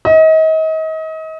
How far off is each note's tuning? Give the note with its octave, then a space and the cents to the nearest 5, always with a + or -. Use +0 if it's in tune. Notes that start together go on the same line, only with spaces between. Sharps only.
D#5 +35